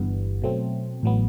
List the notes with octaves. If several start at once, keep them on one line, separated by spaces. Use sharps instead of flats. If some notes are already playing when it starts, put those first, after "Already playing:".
Already playing: G1 G2 E3 G3 B3
B2 F#3 A3 C4
A1 A2 F#3 B3